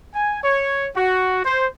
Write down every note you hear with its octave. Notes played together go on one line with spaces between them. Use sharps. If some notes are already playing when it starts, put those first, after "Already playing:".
G#5
C#5
F#4
C5